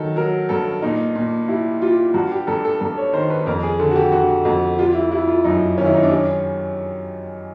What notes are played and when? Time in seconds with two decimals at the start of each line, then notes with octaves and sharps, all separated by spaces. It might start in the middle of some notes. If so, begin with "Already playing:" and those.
Already playing: D#3 F#3 A4
0.16 F#3 A#4
0.49 G2 A4
0.82 A#2 D#4
1.15 A#2
1.49 G3 E4
1.82 G3 F4
2.14 G2 F#4
2.32 G4
2.47 G2 A4
2.65 A4
2.80 G2 A4
2.98 C#5
3.13 D#3 C5
3.30 B4
3.46 F2 A#4
3.63 G#4
3.79 D3 A4
3.91 F#4
3.96 G4
4.12 D3 F#4
4.45 F2 F#4
4.79 G3 F4
4.95 E4
5.12 G3 E4
5.28 F4
5.44 F#2 D#4
5.78 D#3 C#4
5.86 E4
5.94 D#4
6.03 D4
6.10 G3 C#4